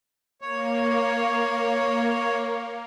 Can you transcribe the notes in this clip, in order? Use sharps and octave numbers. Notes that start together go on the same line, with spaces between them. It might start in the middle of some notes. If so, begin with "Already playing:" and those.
A#3 C#5